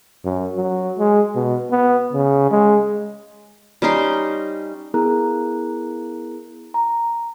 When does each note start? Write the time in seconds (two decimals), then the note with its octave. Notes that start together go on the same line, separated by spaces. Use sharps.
0.25 F#2
0.56 F#3
0.98 G#3
1.36 B2
1.71 B3
2.13 C#3
2.51 G#3
3.82 G3 C#4 D#4 C6
4.94 B3 E4 G#4 A#4 A#5 F#6
6.74 A#5